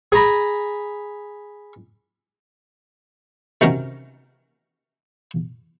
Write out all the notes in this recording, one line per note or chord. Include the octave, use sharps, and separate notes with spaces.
G#4 A#5 B5
C3 D#3 F#3 C#4 A#4